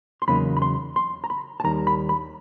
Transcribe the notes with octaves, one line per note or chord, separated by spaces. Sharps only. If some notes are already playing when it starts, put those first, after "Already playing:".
C6
E2 C#3 F#3 A#3 D#4 B5
B5
C6
C6
A#5
B5
A5
D#2 D#3 G3 A#5
B5
B5